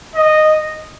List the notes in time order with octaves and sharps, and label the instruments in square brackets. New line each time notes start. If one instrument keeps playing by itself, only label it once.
[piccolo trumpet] D#5